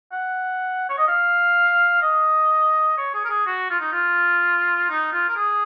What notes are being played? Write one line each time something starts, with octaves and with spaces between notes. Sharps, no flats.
F#5
C#5
D#5
F5
D#5
C#5
G#4
A#4
G#4
F#4
F4
D#4
F4
D#4
F4
A#4
G#4